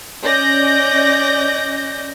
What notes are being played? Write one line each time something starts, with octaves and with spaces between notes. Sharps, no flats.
C#4 D5 D#5 G6 A#6